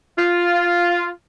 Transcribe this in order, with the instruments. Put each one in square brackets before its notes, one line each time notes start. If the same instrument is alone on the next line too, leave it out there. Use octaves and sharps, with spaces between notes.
[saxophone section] F4